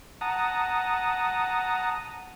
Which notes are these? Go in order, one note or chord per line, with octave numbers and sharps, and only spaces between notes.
F#5 A5 A#5 D#6